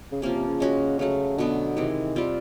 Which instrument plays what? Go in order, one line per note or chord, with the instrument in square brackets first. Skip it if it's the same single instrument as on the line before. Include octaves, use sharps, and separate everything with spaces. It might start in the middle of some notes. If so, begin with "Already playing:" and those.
[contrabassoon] C#3
[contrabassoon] C3 [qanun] F3 A#3 C#4
[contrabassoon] C3
C#3
[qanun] G#3 C#4 F#4
[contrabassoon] C#3 [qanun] F#3 A3 C#4
[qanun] B2 F#3 B3 [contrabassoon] D3
[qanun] C3 E3 G#3 [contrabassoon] D#3
[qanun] G3 C4 F4